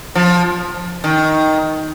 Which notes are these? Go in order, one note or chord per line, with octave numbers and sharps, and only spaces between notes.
F3
D#3